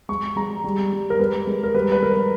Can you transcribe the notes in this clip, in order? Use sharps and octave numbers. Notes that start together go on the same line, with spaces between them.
G#3 C#6
G#3 A#5
G3
G3
A#4
G#3 B4
G#3
A#4
G3 B4
B4
G3 A#4